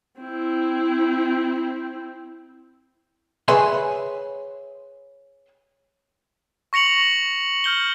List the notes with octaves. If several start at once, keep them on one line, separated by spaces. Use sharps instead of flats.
C4 E4
G#4 B4 C#5 E5 G#5 C6
C#6 A#6 C#7 F7 F#7
F6 G6 G7